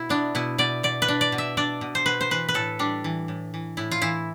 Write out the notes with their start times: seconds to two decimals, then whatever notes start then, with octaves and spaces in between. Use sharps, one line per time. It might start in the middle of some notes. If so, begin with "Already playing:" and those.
Already playing: B2 E4
0.09 B3 D4
0.35 B2 E4
0.58 B2 D5
0.83 B2 D5
1.02 B4
1.08 D4
1.21 D5
1.32 B2
1.38 E5
1.57 D4 D5
1.81 B2
1.95 C5
2.06 B2 B4
2.21 C5
2.31 E3 B4
2.49 B4
2.54 A2 A4
2.79 G3 D4
3.04 E3
3.28 A2
3.54 E3
3.77 A2 E4
3.91 F4
4.02 E3 E4